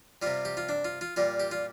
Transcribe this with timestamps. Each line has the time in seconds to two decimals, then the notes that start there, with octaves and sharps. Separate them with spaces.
0.22 C3 G3 F4
0.45 G4
0.57 F4
0.69 D4
0.85 F4
1.01 F4
1.16 A#2 G3 F4
1.40 G4
1.51 F4